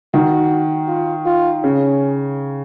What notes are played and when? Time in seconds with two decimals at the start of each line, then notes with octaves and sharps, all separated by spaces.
0.14 D#3 F#4
0.88 F4
1.26 F4
1.63 C#3 C#4